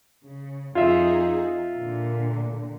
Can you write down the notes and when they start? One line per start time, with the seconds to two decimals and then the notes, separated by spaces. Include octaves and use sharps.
0.25 C#3
0.75 F2 D#4 F4 G#4 E5
1.75 A#2 D3